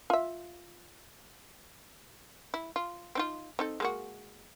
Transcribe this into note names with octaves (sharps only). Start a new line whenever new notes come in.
F4 E5
E4
F4
C4 D#4 F4
C4 D#4 A4
G#3 A#3 F#4